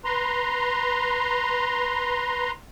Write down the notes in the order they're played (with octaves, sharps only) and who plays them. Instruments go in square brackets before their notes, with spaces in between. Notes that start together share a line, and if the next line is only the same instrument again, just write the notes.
[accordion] B4 A#5 C6